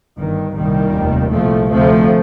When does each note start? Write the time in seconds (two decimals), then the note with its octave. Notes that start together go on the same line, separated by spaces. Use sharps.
0.18 G1 G2 D#3
0.55 C2 A#2 D#3 G3
0.94 F1 D#2
1.31 C2 A#2 F3 A3
1.70 D2 C3 F3 A3